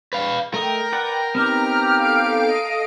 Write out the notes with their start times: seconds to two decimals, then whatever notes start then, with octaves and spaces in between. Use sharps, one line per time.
0.13 B4 F5
0.54 A3 A#4 D#5 G5
0.92 B4 D5 F#5
1.35 B3 C4 D#4 G4 A#5 F6
1.99 A4 F5 D7
2.46 D#5